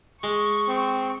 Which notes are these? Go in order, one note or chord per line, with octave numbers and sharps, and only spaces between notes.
G#3 C#6
C4